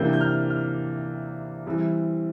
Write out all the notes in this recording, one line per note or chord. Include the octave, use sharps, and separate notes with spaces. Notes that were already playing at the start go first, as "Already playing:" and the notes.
Already playing: C3 E3 A#3 D4 G6
G6
F6
F6
E3 G3 C4